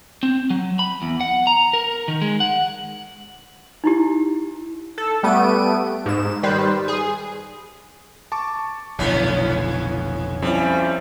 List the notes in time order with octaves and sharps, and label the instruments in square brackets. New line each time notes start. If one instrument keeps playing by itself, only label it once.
[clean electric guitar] C4
F#3
B5
E2
F#5
A#5
A#4
D#3
G#3
F#5
[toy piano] D#4 E4 G4
[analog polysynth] A4
G3 A3 B3 D7 D#7
G#2 E7
D#3 G3 B4 C5
G#4
[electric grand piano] A5 C#6 D6
[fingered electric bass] F1 F2 D3 [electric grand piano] B1 [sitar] A2 B3 C#4
[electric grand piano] F2 [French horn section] F3 C#4 E4 [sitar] G3